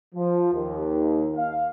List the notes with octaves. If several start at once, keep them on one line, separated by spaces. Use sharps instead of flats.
F3
D#2
F5